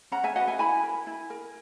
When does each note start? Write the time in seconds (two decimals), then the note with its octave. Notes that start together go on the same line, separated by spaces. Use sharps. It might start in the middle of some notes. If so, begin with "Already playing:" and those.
0.12 C#4 F#5 A#5
0.24 E5 G#5
0.36 F#4 B4 D#5 F#5
0.47 E5 G#5
0.59 E4 G#5 B5
0.83 A#4
1.07 E4
1.30 A#4